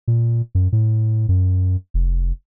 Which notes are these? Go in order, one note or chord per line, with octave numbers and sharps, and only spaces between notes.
A#2
F#2
A2
F#2
F1